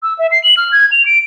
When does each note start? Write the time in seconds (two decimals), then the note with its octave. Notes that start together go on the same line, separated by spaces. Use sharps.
0.03 E6
0.19 E5
0.31 C7
0.44 F#7
0.57 F6
0.72 G#6
0.91 F7
1.05 D7